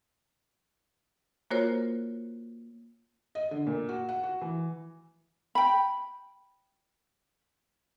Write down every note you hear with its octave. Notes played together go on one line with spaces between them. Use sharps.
A#3 F4 F#4 A#4 C5 C#5
D#5
D3
A#2
F#4
F#5
F#4
E3
G5 B5